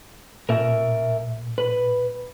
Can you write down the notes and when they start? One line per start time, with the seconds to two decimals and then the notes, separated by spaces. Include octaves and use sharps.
0.49 A#2 A#4 E5
1.58 B4